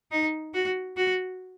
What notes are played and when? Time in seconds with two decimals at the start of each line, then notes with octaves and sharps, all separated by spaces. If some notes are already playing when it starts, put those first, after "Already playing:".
0.12 D#4
0.54 F#4
0.97 F#4